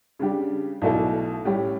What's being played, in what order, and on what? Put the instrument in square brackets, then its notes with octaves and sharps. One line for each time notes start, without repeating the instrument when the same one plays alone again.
[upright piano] C#3 G3 D4 G4
B1 B2 A3 E4 A4
A2 G3 C#4 G4